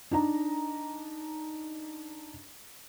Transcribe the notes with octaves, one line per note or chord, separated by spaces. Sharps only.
D4 D#4 A#5